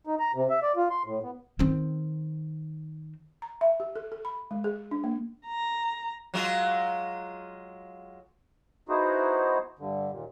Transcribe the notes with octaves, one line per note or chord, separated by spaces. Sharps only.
D#4
A#5
C3
E5
D5
F4
C6
A2
B3
D#3 C4
A#5
E5
G4
A4
A4
B5
G#3
G#4
D4
A#3
A#5
F#3 G#3 F4
B3 D#4 E4 F#4 G#4 C5
G2 D3
D#2 A#2